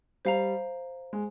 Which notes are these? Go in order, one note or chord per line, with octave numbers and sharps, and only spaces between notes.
G3 C5 F5 A#5
G#3